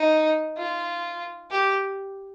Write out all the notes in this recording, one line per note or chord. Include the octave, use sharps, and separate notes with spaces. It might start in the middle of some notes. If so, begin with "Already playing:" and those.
Already playing: D#4
F4
G4